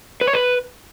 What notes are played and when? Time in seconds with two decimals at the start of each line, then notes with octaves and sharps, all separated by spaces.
0.21 B4
0.27 C#5
0.34 B4